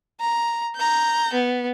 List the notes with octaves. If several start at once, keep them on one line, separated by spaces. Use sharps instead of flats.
A#5
A#5 G6
B3